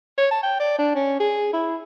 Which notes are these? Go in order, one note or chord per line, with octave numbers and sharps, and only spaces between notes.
C#5
A5
G5
D5
D4
C#4
G#4
E4